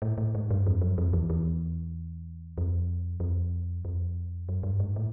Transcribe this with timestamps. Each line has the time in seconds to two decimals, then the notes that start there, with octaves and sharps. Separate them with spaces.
0.02 A2
0.18 A2
0.35 G#2
0.50 G2
0.67 F2
0.81 F#2
0.98 F2
1.13 E2
1.30 E2
2.58 F2
3.20 F2
3.85 F2
4.49 F#2
4.63 G2
4.80 G#2
4.96 A2